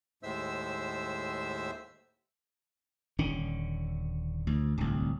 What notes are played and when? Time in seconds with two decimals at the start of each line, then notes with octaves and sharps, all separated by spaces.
0.23 D#2 A2 G#3 C5 E5 E6
3.18 D#1 D3 C#4
4.47 D2
4.77 D1 C2